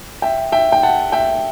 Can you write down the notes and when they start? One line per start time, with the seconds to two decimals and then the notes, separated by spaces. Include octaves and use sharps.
0.22 E5 G5
0.52 E5 G5
0.72 G5
0.83 F#5 A5
1.12 E5 G5